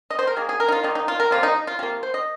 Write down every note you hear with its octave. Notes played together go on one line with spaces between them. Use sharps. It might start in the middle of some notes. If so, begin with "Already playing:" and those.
D#5
C5
A#4
D#3 A#3 G#4
G#4
A#4
D#4
F4
D#3 A#3 D#4
D#4
F4
A#4
C3 F3 A#3 F4
D#4
F4
C3 F3 A#3 F4
C5
D#5